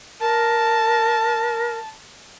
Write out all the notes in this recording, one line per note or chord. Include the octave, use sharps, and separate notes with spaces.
A#4 A5